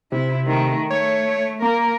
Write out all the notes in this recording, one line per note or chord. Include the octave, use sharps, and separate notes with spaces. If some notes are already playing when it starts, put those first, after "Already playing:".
C3 E4
D#3 A3
A3 C#5
A#3 A#4